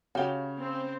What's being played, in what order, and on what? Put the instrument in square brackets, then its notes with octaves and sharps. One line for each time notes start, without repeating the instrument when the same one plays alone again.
[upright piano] C#3 C#4 [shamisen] F#4 G4
[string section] C4